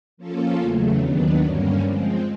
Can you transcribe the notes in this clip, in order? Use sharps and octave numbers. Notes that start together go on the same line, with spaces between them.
F3 A#3 C#4 F4 A4
E2 C#3 F#3 A3
D#2 D#3 F#3 B3 D4
G2 D3 G3 A#3 C#4
F3 G#3 C4